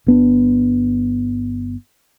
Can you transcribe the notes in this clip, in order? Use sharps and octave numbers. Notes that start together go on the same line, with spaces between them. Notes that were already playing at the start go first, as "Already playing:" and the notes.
G1 B3 D4